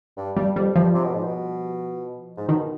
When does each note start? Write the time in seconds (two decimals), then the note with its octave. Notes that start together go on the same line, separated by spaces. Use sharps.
0.17 G2
0.37 G2 G3
0.56 F2 G3
0.75 G2 F3
0.94 C3
1.04 B2
1.14 G#2
1.24 B2
2.37 G#2
2.48 B2 D#3